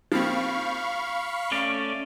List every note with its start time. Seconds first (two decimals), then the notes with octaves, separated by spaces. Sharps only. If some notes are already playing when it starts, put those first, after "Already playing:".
0.12 F3 A#3 C4 F5 B5 C#6
1.52 A3 C#4 D5